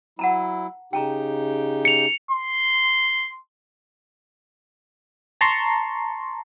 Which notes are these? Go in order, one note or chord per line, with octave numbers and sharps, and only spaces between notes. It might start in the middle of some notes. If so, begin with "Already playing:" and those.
F#3 E4 F#5 A5 A#5
C#3 D#4 G4 G5 A5 A#5
C#7 F7
C6
A5 A#5 C6 C#6